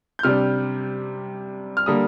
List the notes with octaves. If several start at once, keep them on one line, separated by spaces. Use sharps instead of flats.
G6
C3 G3 D4 F6
F6
D3 G3 A#3 D#6